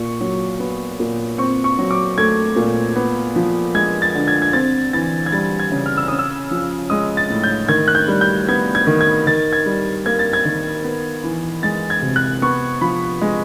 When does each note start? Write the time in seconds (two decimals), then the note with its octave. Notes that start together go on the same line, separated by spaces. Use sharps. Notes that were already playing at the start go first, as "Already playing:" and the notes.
Already playing: A#2 C#6
0.21 F#3
0.60 B3
1.00 A#2
1.38 C4 C#6
1.64 C#6
1.79 F#3
1.91 D6
2.18 A3 G#6
2.56 A#2
2.96 B3
3.36 F3
3.74 G#3 G#6
4.02 A6
4.15 D3
4.28 G#6
4.42 G#6
4.53 C4 A6
4.93 E3 A6
5.26 G#6
5.32 G3 A6
5.59 G#6
5.72 C#3
5.86 F6
5.97 E6
6.08 C#4 D#6
6.19 E6
6.51 F3
6.90 G#3 D#6
7.17 A6
7.30 A2
7.43 G6
7.69 D#3 G#6
7.88 F#6
7.95 G6
8.08 G3
8.21 G6
8.48 B3 G#6
8.75 G#6
8.87 D#3
9.01 G#6
9.26 D#3 A6
9.53 G#6
9.66 G3
10.06 A#3 G#6
10.19 A6
10.33 G#6
10.45 D#3
10.84 B3
11.23 E3
11.63 G#3 A6
11.90 G#6
12.02 C3
12.16 F#6
12.42 B3 C#6
12.81 F3 B5
13.21 G#3